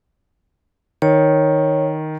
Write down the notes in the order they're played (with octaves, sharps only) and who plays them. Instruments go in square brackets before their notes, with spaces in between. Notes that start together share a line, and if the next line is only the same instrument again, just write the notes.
[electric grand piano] D#3 [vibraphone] C#5